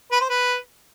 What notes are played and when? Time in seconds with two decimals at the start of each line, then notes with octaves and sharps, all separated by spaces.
0.12 B4
0.21 C5
0.29 B4